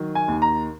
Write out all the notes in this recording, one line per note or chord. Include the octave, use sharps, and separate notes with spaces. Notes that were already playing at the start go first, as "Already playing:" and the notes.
Already playing: D#3 F#3
G#5
D#2
A#5